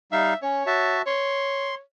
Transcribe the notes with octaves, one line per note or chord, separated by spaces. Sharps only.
G3 D#4 E5 F5
C#4 C#5
F#4 E5 A5
C#5 C6